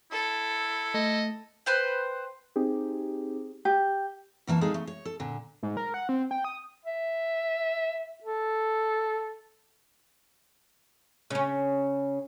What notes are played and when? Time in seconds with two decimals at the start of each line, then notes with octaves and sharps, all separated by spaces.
0.12 E4 A4
0.94 A3 D#5
1.66 B4 C5 G5
2.56 C4 D#4 G4 G#4
3.65 G4
4.47 B2 E3 A#3 A5
4.61 G#3 D#4 G#4 A4 F5
4.74 A3
4.87 C#5
5.05 A4
5.20 A#2 D3
5.63 G#2
5.77 A#4
5.94 F#5
6.09 C4
6.31 G5
6.44 D#6
6.85 E5
8.24 A4
11.30 C#3 C#4